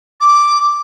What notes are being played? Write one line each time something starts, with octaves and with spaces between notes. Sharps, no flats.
D6